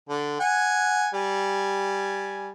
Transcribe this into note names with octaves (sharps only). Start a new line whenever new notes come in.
D3
F#5 G#5
G3 G#5